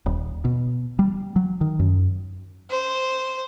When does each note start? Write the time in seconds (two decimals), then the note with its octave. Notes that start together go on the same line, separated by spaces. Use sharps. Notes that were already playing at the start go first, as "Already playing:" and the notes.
0.06 D#1
0.45 B2
0.99 G3
1.36 F#3
1.61 D#3
1.79 F#2
2.70 C5